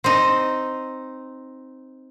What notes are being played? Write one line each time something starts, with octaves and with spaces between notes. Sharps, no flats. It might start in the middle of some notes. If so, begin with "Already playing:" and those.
C4 D#4